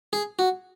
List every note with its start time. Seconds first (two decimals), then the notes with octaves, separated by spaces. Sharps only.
0.13 G#4
0.39 F#4